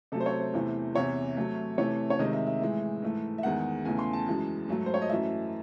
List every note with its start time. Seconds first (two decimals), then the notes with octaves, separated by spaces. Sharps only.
0.12 C3 F#3 A3 A4
0.20 C5
0.26 C#5
0.40 C5
0.53 E2 C3 E3 A3
0.95 E2 C3 E3 C#5
1.37 C3 F#3 A3
1.78 C3 E3 A3 C#5
2.10 C#5
2.19 C3 D#3 G#3 D#5
2.33 E5
2.47 E5
2.61 A2 E3 G#3
3.02 G#2 E3 A3
3.38 E5
3.43 E2 D#3 G#3 F#5
3.85 E2 C#3 E3 A3 G#5
3.99 C6
4.13 A5
4.27 F#2 E3 G#3
4.68 G#2 F#3 A3
4.86 C5
4.94 C#5
5.02 D#5
5.09 F#2 E3 A3 E5